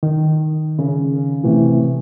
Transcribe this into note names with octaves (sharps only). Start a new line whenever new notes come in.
D#3
C#3
A2 C3 E3